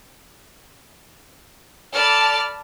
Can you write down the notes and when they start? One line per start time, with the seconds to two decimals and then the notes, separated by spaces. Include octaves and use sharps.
1.95 A4 D5 A5 B5 F6